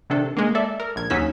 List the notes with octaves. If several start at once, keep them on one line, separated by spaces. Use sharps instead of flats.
C3 D#3 D4 A4
G#3 A#3
A4 D5 E5
A#4
A#1 G#6
D#2 F#3 C#4 D#4 E6 B6